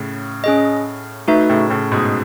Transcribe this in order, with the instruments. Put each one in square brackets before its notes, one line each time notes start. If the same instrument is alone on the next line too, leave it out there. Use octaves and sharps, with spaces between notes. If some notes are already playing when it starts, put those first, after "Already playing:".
Already playing: [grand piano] A2 C#3
[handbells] C#4 G#4 D#5
A3 D#4 F#4 B4 E5
[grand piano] A2 C#3
A2 C#3
G#2 B2